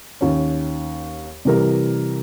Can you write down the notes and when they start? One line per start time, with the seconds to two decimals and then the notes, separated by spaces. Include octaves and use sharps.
0.21 D#2 C#4
1.45 C3 E3 G3 A#4